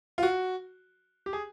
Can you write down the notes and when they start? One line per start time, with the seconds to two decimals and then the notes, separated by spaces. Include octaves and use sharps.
0.18 F4
0.23 F#4
1.26 G4
1.33 G#4